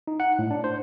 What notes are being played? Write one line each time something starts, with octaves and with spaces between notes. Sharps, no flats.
D#4
F#5
A2
D4
C5